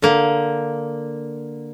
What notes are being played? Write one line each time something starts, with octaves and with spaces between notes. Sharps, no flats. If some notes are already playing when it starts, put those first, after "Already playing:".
D3 A#3